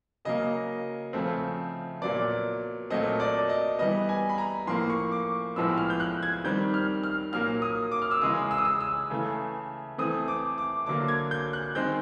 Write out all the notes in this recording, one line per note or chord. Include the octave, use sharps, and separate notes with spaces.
C#3 F#3 A#3 D#5
C#3 F3 A3 C4
A#2 F#3 B3 D5
A#2 F#3 A3 C4 D#5
D5
D#5
E3 G3 B3 D#5
G#5
B5
A#5
A2 F3 A#3 C6
C#6
D6
A2 F3 G#3 B3 E6
F6
G6
F#6
G#6
D#3 G3 C4 G6
F6
F6
A#2 F#3 A#3 F6
D#6
D6
F6
E6
C#3 E3 G#3 D#6
E6
D#6
E6
E6
C#3 E3 A3
E3 A3 C4 D#6
D6
D6
D3 F#3 A#3 D6
G#6
G6
F#6
D#3 G#3 C4 G6